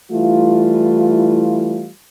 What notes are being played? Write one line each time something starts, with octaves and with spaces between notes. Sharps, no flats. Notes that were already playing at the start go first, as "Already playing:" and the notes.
E3 G3 A3 E4 F4